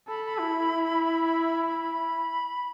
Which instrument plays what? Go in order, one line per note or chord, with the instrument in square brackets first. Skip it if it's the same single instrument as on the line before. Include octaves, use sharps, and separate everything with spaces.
[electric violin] A4 [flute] B5
[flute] B5
[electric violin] E4
[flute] B5